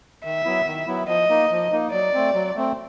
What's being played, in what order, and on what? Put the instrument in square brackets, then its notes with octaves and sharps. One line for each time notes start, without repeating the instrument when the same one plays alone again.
[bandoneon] D#3 [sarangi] E5
[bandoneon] F#3 B3 E4
D#3
F#3 B3 E4
[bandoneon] F3 [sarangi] D#5
[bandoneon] A#3 D#4
F3
A#3 D#4
[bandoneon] F#3 [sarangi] D5
[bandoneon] A3 C4
F#3
A3 C4